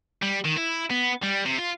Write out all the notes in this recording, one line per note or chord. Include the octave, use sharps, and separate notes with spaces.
G3
D#3
E4
B3
G3
C3
F4